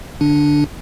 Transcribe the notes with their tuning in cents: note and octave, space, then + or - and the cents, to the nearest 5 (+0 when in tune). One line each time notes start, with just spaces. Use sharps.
D3 +0 D4 +0